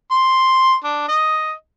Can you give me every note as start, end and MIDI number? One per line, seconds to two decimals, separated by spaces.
0.11 0.75 84
0.84 1.04 62
1.08 1.52 75